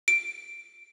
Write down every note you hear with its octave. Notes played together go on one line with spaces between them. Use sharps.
D7